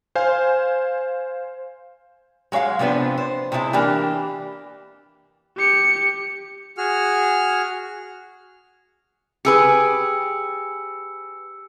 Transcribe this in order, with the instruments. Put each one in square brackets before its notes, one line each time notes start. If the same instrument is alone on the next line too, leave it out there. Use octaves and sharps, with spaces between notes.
[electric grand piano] C5 F5 G#5
[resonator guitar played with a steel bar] F#3 G#3 C#5 F5 F#5
C3 F3 B3 D4 B4
C5
C3 G#3 D4 E4 A5
E3 A#3 D4 G4
[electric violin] G4 C#7
[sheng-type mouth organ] F#4 G#4 F6
[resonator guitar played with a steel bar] G4 G#4 B4 [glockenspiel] E6 C#7